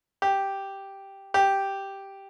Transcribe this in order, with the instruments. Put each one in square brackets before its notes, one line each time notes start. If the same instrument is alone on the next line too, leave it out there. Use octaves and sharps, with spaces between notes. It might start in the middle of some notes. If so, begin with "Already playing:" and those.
[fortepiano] G4
G4